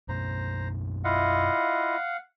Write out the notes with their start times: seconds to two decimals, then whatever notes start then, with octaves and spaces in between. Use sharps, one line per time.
0.09 F#2 B2 A#3 C5 A#5
1.05 E4 F4 D#5 F5 F#5